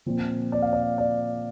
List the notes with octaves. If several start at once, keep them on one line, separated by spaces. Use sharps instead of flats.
A#2 F3 C4
D5
F5
D5
D5